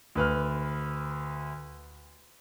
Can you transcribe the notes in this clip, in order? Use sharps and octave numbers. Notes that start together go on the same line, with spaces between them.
D2 B4 F6